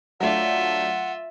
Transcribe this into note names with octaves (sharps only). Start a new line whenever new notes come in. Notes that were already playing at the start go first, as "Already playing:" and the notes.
F#3 A3 D4 F4 E5 F#5